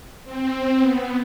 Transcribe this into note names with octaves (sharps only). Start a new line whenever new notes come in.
C4
B3